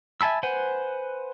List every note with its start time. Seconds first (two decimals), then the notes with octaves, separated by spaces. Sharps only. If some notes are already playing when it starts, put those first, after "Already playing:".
0.21 E5 G#5 A5 B5 E6
0.43 B4 C5 F#5 G#5